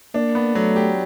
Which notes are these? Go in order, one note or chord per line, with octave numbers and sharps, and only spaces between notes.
A#3 D4
B3
F#3 A3
G4